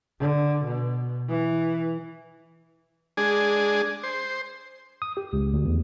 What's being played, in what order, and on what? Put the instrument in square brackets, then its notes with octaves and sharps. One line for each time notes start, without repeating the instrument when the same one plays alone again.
[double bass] D3
B2
E3
[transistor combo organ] G#3 D4 G#4
C5
[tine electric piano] D#6
G4
C#2
D2
E2